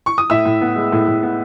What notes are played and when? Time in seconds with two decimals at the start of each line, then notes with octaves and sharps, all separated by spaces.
0.06 C#6
0.18 D#6
0.30 A2 E5 E6
0.45 A2
0.62 B3
0.76 G#3
0.92 A2
1.07 A2
1.23 B3